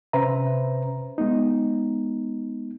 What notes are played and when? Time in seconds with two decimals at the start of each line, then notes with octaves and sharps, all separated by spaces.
0.13 C3 C#4 B4 C5 E5 A#5
1.18 G#3 B3 D#4